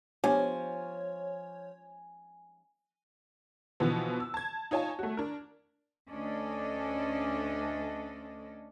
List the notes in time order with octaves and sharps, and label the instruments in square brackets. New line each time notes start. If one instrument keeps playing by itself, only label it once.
[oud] F3 [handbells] B3 D4 G4 [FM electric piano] C#5 [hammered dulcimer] G#5
[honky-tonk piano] B2 D3 E3 F3 B3
E6
A5 G#6
D#4 F4 C#5 G#5 A5
A3 F#4
D4 A#4
[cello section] D2 C#4 D4 A4 D5 D#5